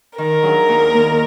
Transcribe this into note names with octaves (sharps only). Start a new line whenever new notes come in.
D#3 A#4
F#3 D4 F4 G#4
D#2
D#3 A#3